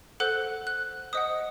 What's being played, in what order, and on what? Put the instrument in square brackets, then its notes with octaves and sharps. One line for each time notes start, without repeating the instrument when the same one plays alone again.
[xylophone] A4 C5 F#5 F#6
F#6
C5 D#5 F#5 D#6